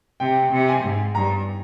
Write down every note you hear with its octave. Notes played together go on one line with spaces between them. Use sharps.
C3 G5
C3
G#5
G#2
G2 A#5